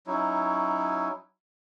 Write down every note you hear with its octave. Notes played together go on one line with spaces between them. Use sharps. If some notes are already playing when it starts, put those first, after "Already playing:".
F#3 C#4 D#4 E4